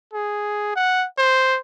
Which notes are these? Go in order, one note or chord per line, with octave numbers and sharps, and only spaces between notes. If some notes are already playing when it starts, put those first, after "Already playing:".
G#4
F#5
C5